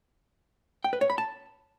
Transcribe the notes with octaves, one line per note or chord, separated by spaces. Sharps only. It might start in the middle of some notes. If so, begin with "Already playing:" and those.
G5
B4
C#5
B5
A5